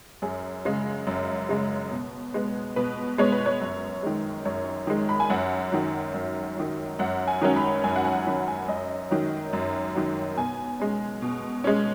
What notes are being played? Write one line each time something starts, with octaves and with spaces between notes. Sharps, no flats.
F#2 G#4
C#3 G#3
F#2
C#3 G#3
B2
G#3 B3
B2 B4
G#3 B3 C#5
B4
C#5
F#2
D#3 G#3
F#2 C#5
D#3 G#3
B5
G#5
F#2 F#5
D#3 F#3
F#2
D#3 F#3
F#2 F#5
G#5
D#3 F#3 C#4
B5
F#2 G#5
F#5
G#5
D#3 F#3 C#4 B5
G#5
F#2 D#5
D#3 F#3
F#2
D#3 F#3
B2 G#5
G#3 C#4
B2
G#3 C#4